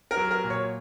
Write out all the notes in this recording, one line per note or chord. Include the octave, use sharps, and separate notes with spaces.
A#4
F#3
A#4
A#2
C#5